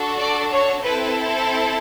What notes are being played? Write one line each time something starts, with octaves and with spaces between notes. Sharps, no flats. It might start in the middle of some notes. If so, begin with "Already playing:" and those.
Already playing: D4 F#4 A4
D5
C#5
C4 E4 A4 B4